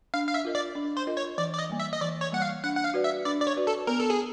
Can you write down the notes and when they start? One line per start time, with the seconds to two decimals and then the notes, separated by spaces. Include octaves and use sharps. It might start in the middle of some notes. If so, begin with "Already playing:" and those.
0.14 D4 F5
0.27 F5
0.34 E5
0.45 F4 A#4 D#5
0.55 D5
0.75 D4
0.97 C5
1.07 F4 A#4 D#5
1.17 C#5
1.38 E3 D5
1.54 D5
1.59 D#5
1.70 G3 A#3
1.80 E5
1.93 D#5
2.01 E3 D5
2.21 C#5
2.32 G3 A#3 F#5
2.42 F5
2.64 D4 F#5
2.76 F#5
2.84 F5
2.94 F#4 B4 D5
3.04 E5
3.25 D4 D5
3.41 D5
3.47 C#5
3.56 F#4 B4 D5
3.67 A4
3.87 B3 A#4
4.00 A4
4.10 G#4